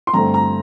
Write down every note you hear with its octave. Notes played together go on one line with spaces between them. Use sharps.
C6
G2 D3 A3 C4 A#5
A#5